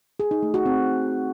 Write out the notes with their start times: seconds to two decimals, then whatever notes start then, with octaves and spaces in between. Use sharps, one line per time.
0.20 G#4
0.31 D#4
0.43 A3
0.54 F#4
0.66 C4